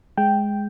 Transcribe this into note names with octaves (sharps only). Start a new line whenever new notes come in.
G#3 G5